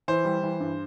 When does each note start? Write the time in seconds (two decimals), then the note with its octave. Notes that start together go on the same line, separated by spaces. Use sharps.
0.08 E3 C5
0.25 G3
0.43 E3
0.60 G2